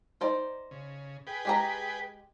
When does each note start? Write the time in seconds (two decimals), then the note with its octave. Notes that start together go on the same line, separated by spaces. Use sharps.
0.21 D#4 C5 D5
0.71 C#3
1.27 G#4 B4 G5
1.45 G#3 G4 A#5